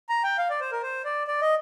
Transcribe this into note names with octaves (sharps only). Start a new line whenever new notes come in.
A#5
G5
F5
D5
C5
A#4
C5
D5
D5
D#5